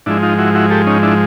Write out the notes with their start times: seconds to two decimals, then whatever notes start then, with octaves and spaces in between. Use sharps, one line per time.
0.06 G#2 F3 G#3 D4 E4
0.23 D#4 F4
0.39 E4 F#4
0.55 E4 F#4
0.70 G4 A4
0.87 C#4 D#4
1.03 D4 E4